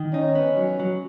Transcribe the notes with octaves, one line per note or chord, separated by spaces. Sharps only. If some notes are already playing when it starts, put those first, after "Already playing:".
Already playing: D#3
C#4 D#4
B3
F#3
F#3